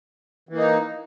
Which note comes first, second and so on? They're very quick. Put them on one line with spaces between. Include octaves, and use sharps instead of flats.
E3 A#3 D#4